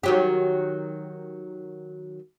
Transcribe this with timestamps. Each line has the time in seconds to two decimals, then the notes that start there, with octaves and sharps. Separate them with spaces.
0.03 D#3 F#3 G4